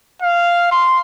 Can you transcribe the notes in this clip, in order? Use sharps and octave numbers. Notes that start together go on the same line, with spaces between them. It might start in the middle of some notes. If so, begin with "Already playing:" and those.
F5
C6